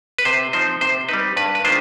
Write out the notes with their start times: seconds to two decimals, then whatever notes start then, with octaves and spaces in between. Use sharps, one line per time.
0.18 B4
0.25 C3 C5
0.53 F3 C4 D#4 C5
0.81 C3 C5
1.09 G3 C4 D#4 B4
1.37 G2 B4
1.55 B4
1.64 D#3 G#3 D4 F4 C5